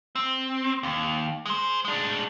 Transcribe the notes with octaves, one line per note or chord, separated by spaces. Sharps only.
C4
D#2
G#3 C5
G#3 D4